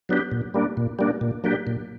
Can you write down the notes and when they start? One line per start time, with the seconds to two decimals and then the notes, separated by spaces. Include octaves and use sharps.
0.09 F#3 B3 D4 G4
0.32 A#2
0.54 G3 A#3 D4
0.77 A#2
0.99 G3 A#3 D4
1.21 A#2
1.44 F#3 A#3 D4 G4
1.67 A#2